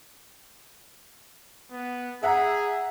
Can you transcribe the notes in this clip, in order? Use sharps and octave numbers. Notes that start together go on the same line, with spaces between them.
B3
G#4 E5 F#5 A#5